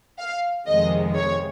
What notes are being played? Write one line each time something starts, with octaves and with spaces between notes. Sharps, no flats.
F5
F2 C3 D#3 G#3 D#5
C#5